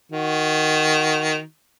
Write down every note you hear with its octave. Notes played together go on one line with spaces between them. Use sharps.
D#3 F#4